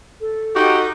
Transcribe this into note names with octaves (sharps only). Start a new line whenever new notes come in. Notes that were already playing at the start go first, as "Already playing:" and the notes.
A4
D#4 F#4 G4